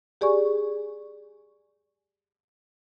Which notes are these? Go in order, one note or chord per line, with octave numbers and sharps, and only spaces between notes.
G4 G#4 D5 G#5 C#6